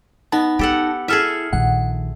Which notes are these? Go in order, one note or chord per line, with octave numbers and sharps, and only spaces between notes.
B3 D#4 A5
B3 G4 A4 F#5
E4 G#4 A4 E5 F6
A#1 D#3 F#5